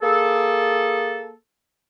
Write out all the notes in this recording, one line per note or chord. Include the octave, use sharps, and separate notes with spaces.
A#3 G#4 A4